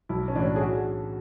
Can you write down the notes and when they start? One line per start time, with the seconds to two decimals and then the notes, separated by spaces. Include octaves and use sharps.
0.09 B1 E4
0.28 C#4
0.35 A2 E3 D4
0.56 G#4
0.61 F#4